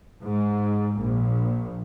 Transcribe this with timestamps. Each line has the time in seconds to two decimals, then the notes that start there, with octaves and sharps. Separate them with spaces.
0.23 G#2
0.97 A#1